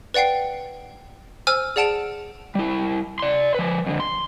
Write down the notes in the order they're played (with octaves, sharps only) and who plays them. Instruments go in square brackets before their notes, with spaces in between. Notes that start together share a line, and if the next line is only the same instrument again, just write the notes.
[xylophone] B4 D5 F#5 G5 C7
C5 G#5 E6 F6
G#4 D5 F#5 A5 D7 F7
[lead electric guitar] G3 E4
D5 C6
F3 B4
F2 D3
C6